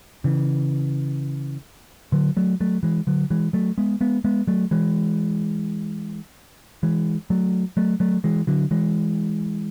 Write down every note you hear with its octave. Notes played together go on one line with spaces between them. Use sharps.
C#3 E3
D3 F#3
F#3 A3
F#3 A3
E3 G#3
D3 F#3
E3 G#3
F#3 A3
G#3 B3
G#3 B3
G#3 B3
F#3 A3
E3 G#3
E3 G#3
F#3 A3
F#3 A3
F#3 A3
E3 G#3
D3 F#3
E3 G#3